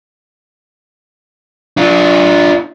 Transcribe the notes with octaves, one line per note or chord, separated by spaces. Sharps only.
D4 F4